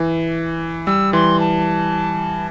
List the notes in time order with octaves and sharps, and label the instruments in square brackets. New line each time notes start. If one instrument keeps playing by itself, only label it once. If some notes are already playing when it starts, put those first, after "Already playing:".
Already playing: [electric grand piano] E3
[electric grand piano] G3 [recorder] E6
[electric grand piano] E3 [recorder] C6
[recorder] A5